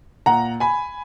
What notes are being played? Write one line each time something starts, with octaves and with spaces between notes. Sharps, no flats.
A#2 F#5 A#5
G#5 B5